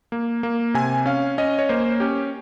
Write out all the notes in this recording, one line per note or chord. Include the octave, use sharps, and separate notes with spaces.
A#3
A#3
C3 G#5
C#4 F5
C#4 D#5
C#5
A#3 C5
C#4 G4